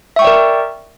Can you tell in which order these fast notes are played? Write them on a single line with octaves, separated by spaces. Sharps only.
E5 C#6 G5 D5 A#4